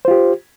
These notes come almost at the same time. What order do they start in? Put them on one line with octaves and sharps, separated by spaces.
C5 F4 G4